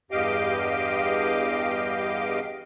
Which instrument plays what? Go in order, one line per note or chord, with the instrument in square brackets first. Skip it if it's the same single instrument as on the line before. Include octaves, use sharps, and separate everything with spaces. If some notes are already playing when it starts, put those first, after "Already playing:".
[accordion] E2 G2 G4 D#5 F5 G5